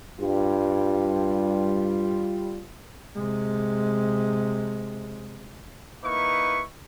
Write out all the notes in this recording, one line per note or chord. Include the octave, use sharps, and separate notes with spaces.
G2 G3 F4
C3 G#3
A#3 D#4 E4 B4 C#6